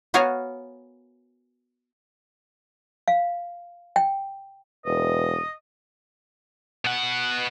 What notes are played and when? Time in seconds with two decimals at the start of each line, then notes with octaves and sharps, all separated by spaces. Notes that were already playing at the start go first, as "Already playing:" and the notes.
0.14 B3 F#4 A#4 C#5 F5 G#5
3.08 F5
3.96 G5
4.86 E1 B4 D#5
6.85 B2 F#5